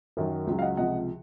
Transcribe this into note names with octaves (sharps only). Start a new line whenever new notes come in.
F#2 D#3 F#3
C#2 C#3 F#3
F5
D#5 F#5
C#2 C3 F3 D#5 F#5